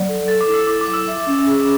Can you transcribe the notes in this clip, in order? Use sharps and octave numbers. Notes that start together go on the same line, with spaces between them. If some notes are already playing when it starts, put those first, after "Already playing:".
Already playing: F#3 D5
A4
A4 A6
D6
E4
E6
E4 D6
D6
F#3
E6
E5
C#4
G#4